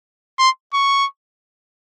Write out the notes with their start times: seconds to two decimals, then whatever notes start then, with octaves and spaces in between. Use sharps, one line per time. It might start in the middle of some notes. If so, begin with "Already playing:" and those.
0.39 C6
0.74 C#6